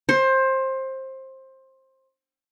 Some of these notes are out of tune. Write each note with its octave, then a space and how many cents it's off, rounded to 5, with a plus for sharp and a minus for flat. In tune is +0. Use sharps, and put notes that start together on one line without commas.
C5 +20